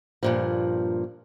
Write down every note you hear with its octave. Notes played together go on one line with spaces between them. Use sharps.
G2 A#2 F3